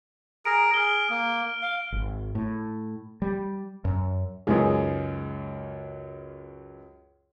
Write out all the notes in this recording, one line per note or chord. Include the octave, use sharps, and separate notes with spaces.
G#4 A#4 A#5 D7
G#4 F6 G7
A#3
F5
G#1
A2
G3
F#2
C#2 F#2 G#3 D#4 G#4